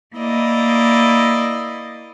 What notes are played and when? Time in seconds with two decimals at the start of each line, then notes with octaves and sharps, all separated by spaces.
0.16 A#3 E4 D5 D#5